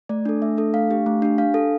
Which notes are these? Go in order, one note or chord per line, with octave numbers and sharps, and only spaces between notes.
A3 D5
D4 A4
A3 E5
D4 A4
A3 F5
D4 G4
A3
D4 G4
D4 F5
A4